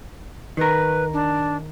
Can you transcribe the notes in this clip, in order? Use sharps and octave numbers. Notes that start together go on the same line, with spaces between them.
D#3 A#4 B4
D4